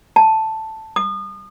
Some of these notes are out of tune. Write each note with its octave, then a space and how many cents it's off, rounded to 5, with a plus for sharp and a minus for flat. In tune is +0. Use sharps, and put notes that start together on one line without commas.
A5 +5
D#6 -35